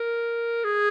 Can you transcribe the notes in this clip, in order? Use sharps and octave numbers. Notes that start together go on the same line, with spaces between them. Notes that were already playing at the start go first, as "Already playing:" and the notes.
Already playing: A#4
G#4